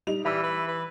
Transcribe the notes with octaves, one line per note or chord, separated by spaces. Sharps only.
G3 D#4 F7
E3 G3 E5 B5 E6
B4
B4